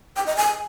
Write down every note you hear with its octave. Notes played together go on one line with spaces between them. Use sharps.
G5
D#5
G#5